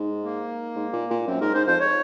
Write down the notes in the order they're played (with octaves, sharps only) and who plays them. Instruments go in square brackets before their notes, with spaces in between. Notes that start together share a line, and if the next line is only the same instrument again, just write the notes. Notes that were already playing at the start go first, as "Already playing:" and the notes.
Already playing: [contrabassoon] G#2
[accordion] A#3
[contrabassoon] G#2
A#2
A#2
[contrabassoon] F#2 [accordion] C4
[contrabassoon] G#2 [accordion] A#4
[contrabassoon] G#2 [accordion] C5
[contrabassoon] F2 [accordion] C5
[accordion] C#5